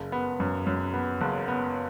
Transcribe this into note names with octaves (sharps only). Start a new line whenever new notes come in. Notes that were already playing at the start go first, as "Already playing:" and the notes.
Already playing: F#1
B3
F#2
F#2
B3
F#1
B3